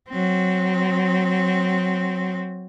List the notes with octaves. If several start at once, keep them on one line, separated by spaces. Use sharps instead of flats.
F#3 C4